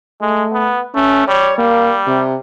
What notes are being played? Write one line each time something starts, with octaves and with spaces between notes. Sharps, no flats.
G#3 A3
B3
A3 C#4
G3 C#5
G3 A#3
C3